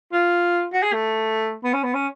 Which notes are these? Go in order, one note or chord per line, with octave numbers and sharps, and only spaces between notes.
F4
F#4
G#4
A3
B3
C#4
B3
C#4